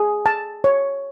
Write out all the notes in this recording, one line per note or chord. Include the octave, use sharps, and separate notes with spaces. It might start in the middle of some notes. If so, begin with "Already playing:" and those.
Already playing: G#4
A5
C#5